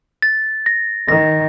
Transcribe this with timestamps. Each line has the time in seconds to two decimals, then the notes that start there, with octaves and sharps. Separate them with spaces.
0.22 A6
0.66 A#6
1.08 D#3 A#6